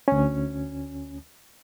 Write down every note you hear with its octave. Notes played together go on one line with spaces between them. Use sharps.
D2 C#4